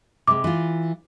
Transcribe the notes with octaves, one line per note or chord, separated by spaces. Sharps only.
C3 G#3 D6
E3 F4